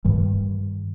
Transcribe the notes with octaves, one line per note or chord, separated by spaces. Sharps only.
G2 D#3 G3